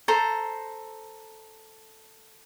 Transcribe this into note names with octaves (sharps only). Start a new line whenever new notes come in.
A4 C5 A#5